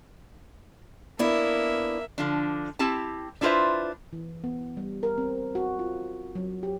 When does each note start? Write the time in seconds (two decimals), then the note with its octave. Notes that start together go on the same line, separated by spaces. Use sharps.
1.19 A#3 B3 D4 E4 E5
2.18 D3 F3 D4
2.79 C4 E4 G4 A5
3.41 D4 E4 F4 B4 C5 E5
4.13 E3
4.44 B3
4.77 G3
5.03 A#4
5.18 C4
5.55 F#4
5.79 F4
6.35 F#3
6.63 G4